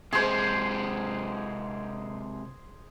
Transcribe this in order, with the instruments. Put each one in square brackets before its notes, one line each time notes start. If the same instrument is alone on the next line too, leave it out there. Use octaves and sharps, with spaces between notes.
[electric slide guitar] C3 G#3 [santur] G#4 C5